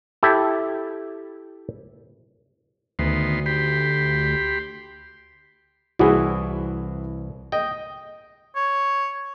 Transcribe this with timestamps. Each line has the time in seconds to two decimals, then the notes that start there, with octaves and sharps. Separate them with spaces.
0.23 E4 G4 A4
2.99 D2 D#3 B3 C6
3.46 G4 B5 C6
5.99 C2 E3 E4 F#4 G#4
7.52 D#5 G5
8.56 C#5